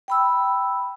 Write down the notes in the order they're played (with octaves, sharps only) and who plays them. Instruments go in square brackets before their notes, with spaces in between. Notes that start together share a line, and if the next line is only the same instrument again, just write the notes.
[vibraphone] G5 B5 E6